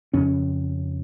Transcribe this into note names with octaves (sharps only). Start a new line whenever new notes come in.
F2 C#3 C#4